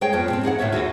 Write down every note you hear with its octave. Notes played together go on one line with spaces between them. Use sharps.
G#3 G#4 C#5 G5
F2 F3 B3
A#2 C4
D#4 G#4 D5 F#5
D2 A2 A3 C#5 E5
D#2 F#4